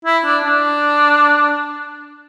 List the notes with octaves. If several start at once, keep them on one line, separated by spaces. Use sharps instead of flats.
E4
D4
D4